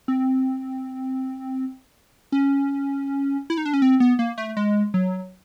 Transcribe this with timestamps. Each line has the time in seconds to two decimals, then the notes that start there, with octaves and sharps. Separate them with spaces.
0.08 C4
2.32 C#4
3.50 E4
3.58 D#4
3.66 D4
3.74 C#4
3.82 C4
4.00 B3
4.19 A#3
4.38 A3
4.57 G#3
4.94 F#3